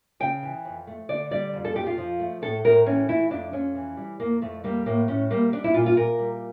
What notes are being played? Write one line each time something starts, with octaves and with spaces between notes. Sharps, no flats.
C#3 G5
E3
F2
A3
D3 D5
G3 D5
F2
A4
F2 G4
F4
F3
A3
A2 A4
A2 A#4
E3 C#4
A3 E4
F2 D4
F2 C#4
E3
G3
F2 A#3
F2 A3
G3 A#3
A2 A#3
A2 C#4
G3 A#3
G3 D4
E4
A#2 F4
F4
A#2 A#4
G3